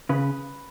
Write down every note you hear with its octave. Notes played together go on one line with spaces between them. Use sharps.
C#3 B4